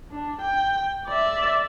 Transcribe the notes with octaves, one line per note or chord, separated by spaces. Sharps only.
D4
G5
D5 E5